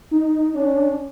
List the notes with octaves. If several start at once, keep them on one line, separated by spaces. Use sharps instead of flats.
D#4
C#4 D4